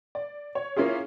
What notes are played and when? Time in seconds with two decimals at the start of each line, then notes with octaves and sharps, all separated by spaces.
0.15 D5
0.55 C#5
0.76 A#3 C#4 E4 F4 G#4